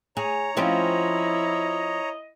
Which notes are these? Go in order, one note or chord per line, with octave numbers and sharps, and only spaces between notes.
G#4 C#5 A#5
F3 C4 C#4 E4 D#5